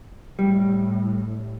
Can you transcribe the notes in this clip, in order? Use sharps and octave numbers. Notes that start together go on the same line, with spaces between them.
A2 G3